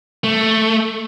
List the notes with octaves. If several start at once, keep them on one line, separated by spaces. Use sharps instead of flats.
A3